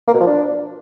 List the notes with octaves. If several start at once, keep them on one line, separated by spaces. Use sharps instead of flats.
A#3
B2
F3
D4